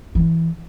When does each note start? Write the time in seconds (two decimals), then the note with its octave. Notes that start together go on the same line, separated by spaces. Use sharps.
0.15 E3